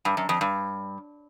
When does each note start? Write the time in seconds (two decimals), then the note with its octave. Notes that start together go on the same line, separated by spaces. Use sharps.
0.05 G2
0.17 F#2
0.29 F2
0.41 G2